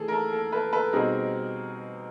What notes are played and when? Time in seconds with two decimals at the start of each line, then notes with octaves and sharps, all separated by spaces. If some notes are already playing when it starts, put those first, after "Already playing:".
Already playing: E3 A3 G#4 A4
0.08 A#4
0.12 A4
0.33 A4
0.52 A4 B4
0.73 A4 B4
0.92 B2 G3 C4 D#4 G#4 A#4